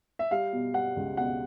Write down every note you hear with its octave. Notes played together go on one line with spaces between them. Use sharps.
E5
G3 F5
B2
G3 F#5
C#2
B2 F#5